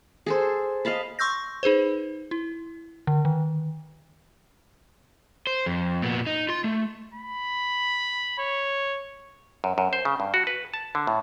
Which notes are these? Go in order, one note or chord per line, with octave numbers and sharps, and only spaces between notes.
G#4 A4 C5
D#5 F5 A5 B5
C6 C#6 E6 G6 A#6
D#4 G#4 B4 C5
E4
D3
D#3
C5
F2
A#2 B3
D#4
F4 C6
A3
B5
C#5
F#2
F#2
C5
C#3
G2
F#4
B4
A5
D3
A2